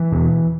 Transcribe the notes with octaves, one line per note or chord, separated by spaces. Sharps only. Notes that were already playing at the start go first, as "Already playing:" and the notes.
Already playing: E3
E2 B2